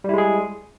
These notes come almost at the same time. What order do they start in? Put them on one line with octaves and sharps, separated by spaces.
G3 E4 G#3 G#4